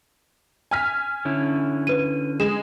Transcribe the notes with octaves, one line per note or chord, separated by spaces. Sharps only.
G#5 F6 B6
D3 C#4 E4
B4 D#7
G#3 E7